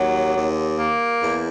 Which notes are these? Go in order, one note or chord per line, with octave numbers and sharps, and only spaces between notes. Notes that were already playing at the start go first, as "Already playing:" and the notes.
Already playing: D#2 F#3
D#2
A#3
E2